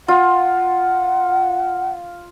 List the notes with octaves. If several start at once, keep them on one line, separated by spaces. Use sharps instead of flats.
F4 F#5